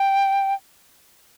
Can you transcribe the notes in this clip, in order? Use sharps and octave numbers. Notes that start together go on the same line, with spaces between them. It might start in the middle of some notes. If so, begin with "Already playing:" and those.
Already playing: G5